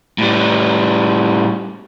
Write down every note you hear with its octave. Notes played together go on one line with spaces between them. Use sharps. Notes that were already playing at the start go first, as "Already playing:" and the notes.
A2 G3